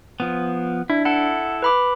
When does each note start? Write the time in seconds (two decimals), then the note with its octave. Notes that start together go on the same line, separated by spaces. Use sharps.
0.20 F3 B3
0.90 D4 E4
1.05 E4 A4 F#5
1.62 B4 B5 D6